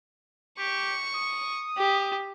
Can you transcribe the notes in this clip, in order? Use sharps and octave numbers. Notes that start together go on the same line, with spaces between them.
G4 C#6
D#6
G4